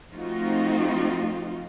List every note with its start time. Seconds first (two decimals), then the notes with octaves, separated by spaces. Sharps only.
0.12 F3 A3 C4 D#4 F4 F#4